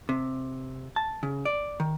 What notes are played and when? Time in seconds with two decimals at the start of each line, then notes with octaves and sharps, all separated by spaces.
0.09 C3
0.96 A5
1.23 C#3
1.45 D5
1.80 D#3